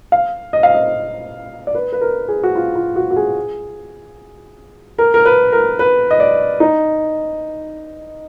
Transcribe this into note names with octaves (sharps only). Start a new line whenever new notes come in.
F5
D#5
F5
D#5
D5
B4
B4
A#4
G#4
F#4
F4
F4
F#4
F#4
G#4
A#4
A#4
B4
A#4
B4
D#5
D5
D#4